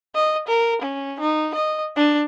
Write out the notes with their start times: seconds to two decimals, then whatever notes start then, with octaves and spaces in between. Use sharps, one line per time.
0.15 D#5
0.48 A#4
0.82 C#4
1.20 D#4
1.55 D#5
1.96 D4